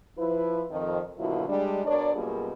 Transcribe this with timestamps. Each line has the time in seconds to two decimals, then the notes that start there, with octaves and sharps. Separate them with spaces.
0.17 F3 E4 B4
0.70 F2 D#3
1.18 D#2 B2 D3 F#3 E4 F4
1.48 G3 G#3 D4
1.85 B2 D4 A#4 C#5 D5
2.15 F#2 B2 G3 A#3 F4 G#4